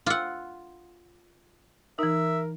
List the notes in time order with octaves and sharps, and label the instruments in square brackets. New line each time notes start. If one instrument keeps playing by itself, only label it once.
[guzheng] F4 F#5 [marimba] D6 E6
[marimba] E3 D#4 [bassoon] A#4 [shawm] E5